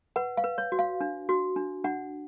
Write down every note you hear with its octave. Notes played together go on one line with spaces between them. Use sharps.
B4 F#5
F5
B4
C#5
F#4
F5
D4
F#4
D4
D4 F#5